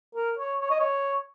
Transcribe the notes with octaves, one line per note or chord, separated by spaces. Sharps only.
A#4
C#5
C#5
D#5
C#5